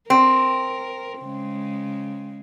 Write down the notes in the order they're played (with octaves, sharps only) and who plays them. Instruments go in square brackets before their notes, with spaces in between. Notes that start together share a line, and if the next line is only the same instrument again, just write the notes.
[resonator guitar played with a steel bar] C4 [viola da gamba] A#4
[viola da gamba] C#3 G#3